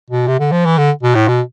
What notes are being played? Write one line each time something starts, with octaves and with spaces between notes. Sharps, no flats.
B2
C3
D3
F3
E3
D3
B2
A2
B2